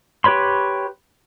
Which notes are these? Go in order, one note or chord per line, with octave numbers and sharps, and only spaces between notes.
G4 B4 C#5 B5 C6